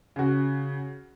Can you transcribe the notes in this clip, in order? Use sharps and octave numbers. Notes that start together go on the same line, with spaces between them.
C#3 F#4